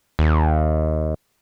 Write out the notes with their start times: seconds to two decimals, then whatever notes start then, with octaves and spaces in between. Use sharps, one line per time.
0.19 D#2